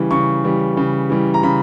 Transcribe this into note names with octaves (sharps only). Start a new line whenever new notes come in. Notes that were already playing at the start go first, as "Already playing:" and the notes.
Already playing: C#3 E3 G3
C#3 C#6
E3 G3
C#3
E3 G3
A#5
C#3 B5